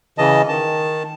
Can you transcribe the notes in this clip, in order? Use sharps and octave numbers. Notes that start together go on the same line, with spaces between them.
C#3 E3 D#5 A5
D#3 A5